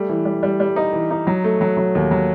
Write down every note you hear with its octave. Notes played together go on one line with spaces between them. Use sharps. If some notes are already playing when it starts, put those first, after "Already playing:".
Already playing: G3 A3
E3
G3
G3
G3
D#4
E3
D#4
F#3
A3
F#3
F#3
D#2
F#3